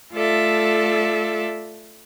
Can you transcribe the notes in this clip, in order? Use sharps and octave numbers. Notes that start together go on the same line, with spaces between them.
A3 F4 A4 D5 E5